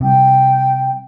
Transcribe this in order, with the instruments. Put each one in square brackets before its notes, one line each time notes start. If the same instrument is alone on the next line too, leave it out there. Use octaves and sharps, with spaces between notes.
[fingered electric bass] C3 G3 [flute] G5